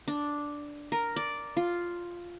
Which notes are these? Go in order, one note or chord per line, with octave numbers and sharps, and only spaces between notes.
D4
A#4
D5
F4